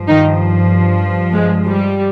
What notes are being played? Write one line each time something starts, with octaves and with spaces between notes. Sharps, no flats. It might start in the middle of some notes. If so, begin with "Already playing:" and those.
Already playing: G2 F3
D#3 D#4
G#3
G3